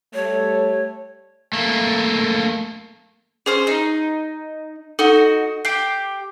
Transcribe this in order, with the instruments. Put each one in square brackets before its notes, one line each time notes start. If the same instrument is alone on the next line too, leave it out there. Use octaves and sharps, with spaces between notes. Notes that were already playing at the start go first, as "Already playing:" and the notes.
[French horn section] G3 A3 [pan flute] C#5
[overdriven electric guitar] A3 A#3
[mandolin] C#4 C5 F6 [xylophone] G#4
[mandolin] D#4
[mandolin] D#4 F#4 [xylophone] A4
[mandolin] G4 G5 [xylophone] C7